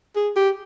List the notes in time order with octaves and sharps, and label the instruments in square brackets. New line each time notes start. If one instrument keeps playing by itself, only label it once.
[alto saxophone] G#4
G4